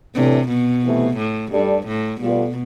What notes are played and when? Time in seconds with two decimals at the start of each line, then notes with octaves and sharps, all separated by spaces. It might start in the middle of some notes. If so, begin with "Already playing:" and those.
0.15 A2 C3 E3 A3 D4
0.49 B2
0.83 C3 E3 A3
1.17 A2
1.52 G2 G3 D4 A4 D5
1.87 A2
2.20 B2 G3 B3 F4 A4 D5